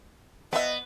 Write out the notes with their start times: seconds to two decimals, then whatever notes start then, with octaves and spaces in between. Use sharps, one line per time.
0.53 F3 B3 D#5 E5